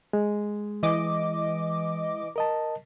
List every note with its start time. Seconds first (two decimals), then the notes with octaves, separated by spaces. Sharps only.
0.13 G#3
0.83 E3 D#5 D6
2.36 A#4 D#5 A5